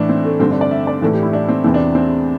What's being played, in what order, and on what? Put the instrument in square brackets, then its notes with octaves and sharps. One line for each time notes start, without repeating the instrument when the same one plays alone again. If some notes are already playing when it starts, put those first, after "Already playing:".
Already playing: [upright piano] A2 E3 D4
C4
A3
G2 D3 C4
D4
D5
E5
D5
A2 E3 A4
G4
E4
D4
C4
E2 C3 E3 C4
D4
C4